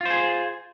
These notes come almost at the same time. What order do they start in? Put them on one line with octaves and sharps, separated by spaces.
F4 C5 G#4